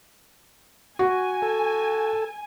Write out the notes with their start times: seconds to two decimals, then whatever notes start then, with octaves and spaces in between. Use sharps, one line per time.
0.99 F#4 G#5
1.42 A4